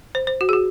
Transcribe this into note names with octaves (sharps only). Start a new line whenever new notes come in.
C5
C5
F#4
G#4
F#4